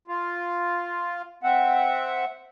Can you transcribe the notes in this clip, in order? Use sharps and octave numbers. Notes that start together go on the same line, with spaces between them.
F4
C4 E5 F#5